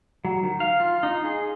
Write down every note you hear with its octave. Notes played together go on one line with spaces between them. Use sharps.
F#3
D#3
F5
F4
D#4
G#4